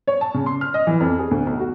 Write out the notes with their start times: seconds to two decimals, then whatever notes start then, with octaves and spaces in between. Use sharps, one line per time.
0.07 C#5
0.21 A5
0.34 C#3
0.46 C6
0.61 F6
0.74 D#5
0.87 E3
1.00 F2
1.19 G#4
1.31 D2
1.47 B1
1.60 F#4